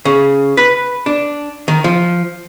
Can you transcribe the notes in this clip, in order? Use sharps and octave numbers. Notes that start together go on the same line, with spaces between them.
C#3
B4
D4
D#3
F3